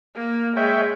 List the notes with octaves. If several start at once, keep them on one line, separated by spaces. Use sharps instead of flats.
A#3
G#3 C#5 E5 G5